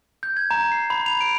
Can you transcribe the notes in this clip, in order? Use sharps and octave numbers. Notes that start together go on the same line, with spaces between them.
G6
G#6
A#5
C7
B5
F7
D7